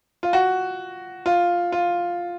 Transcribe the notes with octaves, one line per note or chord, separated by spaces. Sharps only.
F4
F#4
F4
F4